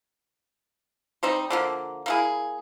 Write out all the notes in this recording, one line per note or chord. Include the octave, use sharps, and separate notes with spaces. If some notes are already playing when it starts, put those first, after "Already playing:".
G3 C4 D#4
D3 F3 A#3
A#3 E4 G#4